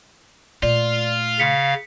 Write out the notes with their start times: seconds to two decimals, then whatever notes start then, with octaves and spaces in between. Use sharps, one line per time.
0.63 A#2 A3 F4 D5
1.39 C#3 F5 B6 C#7